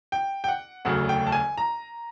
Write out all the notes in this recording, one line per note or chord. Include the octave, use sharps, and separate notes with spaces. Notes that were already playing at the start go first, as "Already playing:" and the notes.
G5
G5
F#5
E1 D2 C#3 F#3 A3 F#5
G5
A5
G#5
A#5